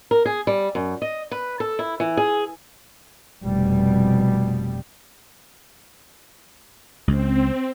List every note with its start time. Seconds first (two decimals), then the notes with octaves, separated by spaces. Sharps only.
0.11 A#4
0.25 G#4
0.47 G3
0.75 F#2
1.02 D#5
1.31 B4
1.60 A4
1.79 E4
2.00 E3
2.17 G#4
3.43 F1 B2 G3
7.08 C#2 C4